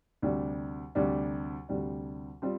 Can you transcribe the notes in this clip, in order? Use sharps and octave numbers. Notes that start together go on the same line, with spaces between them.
D2 C3 G3 D4
D2 C3 G3 D4
D2 C3 G3 D4
G3 C4 F4